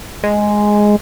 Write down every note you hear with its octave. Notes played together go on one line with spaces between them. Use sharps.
G#3